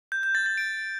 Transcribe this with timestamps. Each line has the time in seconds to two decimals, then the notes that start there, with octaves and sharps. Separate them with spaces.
0.12 G6
0.23 G6
0.35 A6
0.46 A6
0.57 D7